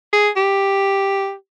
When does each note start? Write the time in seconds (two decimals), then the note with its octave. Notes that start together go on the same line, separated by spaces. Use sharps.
0.13 G#4
0.36 G4